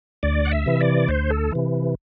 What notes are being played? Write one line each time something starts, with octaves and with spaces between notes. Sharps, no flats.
D2 D5
F#5
E5
C3 E3
D5
D2 C5
A4
C3 E3